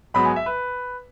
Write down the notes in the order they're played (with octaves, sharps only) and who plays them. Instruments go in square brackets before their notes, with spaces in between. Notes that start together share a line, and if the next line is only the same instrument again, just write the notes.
[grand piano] G#2 F#3 B3 B5
G#5
E5
B4